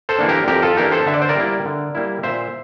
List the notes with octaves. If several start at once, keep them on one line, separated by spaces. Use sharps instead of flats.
A4 C5
E3 A#3 D4
G4 A#4
F2 G4 A#4
F4 A4
E3 A#3 D4 G4 A#4
A4 C5
D3 E5
D5
C5
A#4 D5
G3 A#3 E4
D3
G3 A#3 E4
A#2 C5 E5